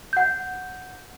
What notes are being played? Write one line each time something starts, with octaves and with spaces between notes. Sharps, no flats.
F#5 G6